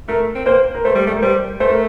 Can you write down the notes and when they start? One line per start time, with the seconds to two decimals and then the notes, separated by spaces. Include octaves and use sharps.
0.08 A3 A#4
0.35 C4
0.46 A#3 C5
0.75 A#4
0.85 A3 C5
0.95 G3
1.07 A3
1.13 A#4
1.22 G3 C5
1.60 A3 C5
1.70 A#4